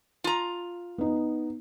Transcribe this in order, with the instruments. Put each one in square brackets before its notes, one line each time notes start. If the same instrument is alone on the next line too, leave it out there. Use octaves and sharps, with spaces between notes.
[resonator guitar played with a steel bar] F4 A#5
[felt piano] B3 D#4